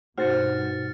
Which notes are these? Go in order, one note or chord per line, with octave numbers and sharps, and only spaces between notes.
G2 B2 D#4 F#4 C5 F6 A6 C#7